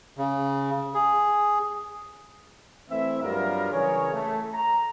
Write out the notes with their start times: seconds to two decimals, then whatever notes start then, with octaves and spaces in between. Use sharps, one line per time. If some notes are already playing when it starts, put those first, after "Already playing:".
0.18 C#3
0.95 G#4
2.90 E3 A3 C4 E4 E5
3.21 G2 F#3 G3 B3 F4 A#4
3.73 C#3 E3 G#4 A#4 C#5
4.13 A3
4.53 A#5